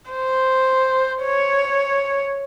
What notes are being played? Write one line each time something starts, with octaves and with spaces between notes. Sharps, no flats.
C5
C#5